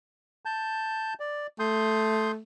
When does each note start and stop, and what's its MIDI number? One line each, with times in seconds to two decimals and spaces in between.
0.45 1.14 81
0.45 1.14 91
1.20 1.47 74
1.59 2.40 57
1.59 2.32 84
1.59 2.32 87
1.59 2.32 91